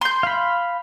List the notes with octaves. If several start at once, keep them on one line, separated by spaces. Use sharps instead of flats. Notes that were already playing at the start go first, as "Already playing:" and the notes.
C6 G6
F5 B5